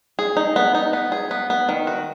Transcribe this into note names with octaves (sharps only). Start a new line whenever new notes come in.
G#4
D#4
B3
D#4
B3
G#4
B3
B3
D#3
F#4